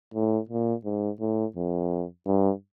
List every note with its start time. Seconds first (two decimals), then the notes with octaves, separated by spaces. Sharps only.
0.14 A2
0.49 A#2
0.85 G#2
1.20 A2
1.56 F2
2.26 G2